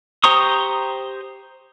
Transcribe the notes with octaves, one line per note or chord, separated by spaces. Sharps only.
G4 C5 A#5 C#6 D#6